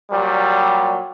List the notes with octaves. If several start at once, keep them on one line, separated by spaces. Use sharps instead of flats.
A#2 F#3 G3